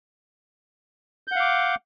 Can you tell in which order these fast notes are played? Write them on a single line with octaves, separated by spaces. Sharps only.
G6 F#5 F5 D6